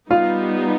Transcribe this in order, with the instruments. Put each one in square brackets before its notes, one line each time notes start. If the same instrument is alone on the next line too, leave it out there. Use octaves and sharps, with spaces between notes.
[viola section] G3 B3 D#4 [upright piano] F4 F5